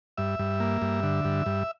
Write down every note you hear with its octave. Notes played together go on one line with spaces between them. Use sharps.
G2 E5
G2
A#3
G2
D3
G2
G2